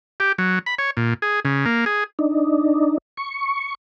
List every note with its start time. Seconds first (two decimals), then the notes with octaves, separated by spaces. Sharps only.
0.20 G4
0.38 F#3
0.66 B5
0.79 C#5
0.97 A#2
1.22 G#4
1.45 C#3
1.66 A#3
1.86 G#4
2.19 D4 D#4
3.17 C#6